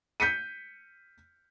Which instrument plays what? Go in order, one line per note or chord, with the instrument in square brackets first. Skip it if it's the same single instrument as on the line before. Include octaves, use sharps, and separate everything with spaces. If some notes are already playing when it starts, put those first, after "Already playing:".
[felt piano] G6 B6 C#7 D#7